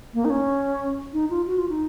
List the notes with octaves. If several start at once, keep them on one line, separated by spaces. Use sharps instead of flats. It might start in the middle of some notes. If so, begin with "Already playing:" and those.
A#3
D#4
C#4
D#4
F4
F#4
F4
D#4